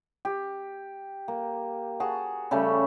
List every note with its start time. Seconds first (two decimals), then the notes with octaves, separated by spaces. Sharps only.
0.25 G4
1.28 A#3
2.00 F#4 G#4 A5
2.51 C#3 G3 A3 C#4